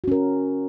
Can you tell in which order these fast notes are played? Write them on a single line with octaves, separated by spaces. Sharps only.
F#4 C#4 A#4